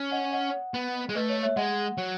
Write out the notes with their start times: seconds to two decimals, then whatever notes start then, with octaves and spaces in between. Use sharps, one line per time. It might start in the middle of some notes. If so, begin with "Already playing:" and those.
Already playing: C#4
0.12 D#5 F#5
0.33 D#5 F#5
0.74 B3
1.09 G#3
1.15 A3 B4 D#5
1.29 C#5
1.43 C#5 E5
1.56 G#3 D#5 F#5
1.98 F#3